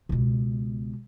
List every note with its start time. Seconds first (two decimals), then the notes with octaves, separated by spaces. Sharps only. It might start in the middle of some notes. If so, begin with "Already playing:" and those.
0.09 C#2 B2